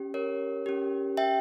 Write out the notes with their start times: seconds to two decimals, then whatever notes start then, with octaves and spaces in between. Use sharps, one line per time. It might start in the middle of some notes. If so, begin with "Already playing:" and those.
Already playing: C#4 G4
0.14 A#4 C#5
0.66 C#4 G4
1.17 E5 G5